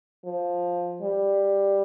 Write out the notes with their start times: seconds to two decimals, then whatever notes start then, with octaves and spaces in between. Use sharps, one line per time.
0.25 F3
1.02 G3